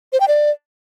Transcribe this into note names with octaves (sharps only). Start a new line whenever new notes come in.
C5
G5
D5